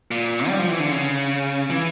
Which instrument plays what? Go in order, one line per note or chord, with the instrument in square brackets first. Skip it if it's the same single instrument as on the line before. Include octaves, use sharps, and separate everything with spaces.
[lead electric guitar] A#2
G3
F3
E3
D3
C#3
E3